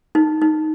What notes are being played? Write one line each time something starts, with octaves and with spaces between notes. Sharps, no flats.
D#4
D#4